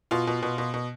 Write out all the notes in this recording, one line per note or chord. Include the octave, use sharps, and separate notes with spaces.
B2 F4
B2
B2
B2
B2